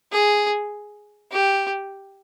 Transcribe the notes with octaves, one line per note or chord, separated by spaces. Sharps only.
G#4
G4